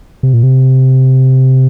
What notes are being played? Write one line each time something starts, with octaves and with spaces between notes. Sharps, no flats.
C3
A#2
C3